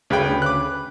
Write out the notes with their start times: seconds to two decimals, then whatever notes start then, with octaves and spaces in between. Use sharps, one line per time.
0.10 G1 D2 C#3 B4 G5
0.42 D6 F#6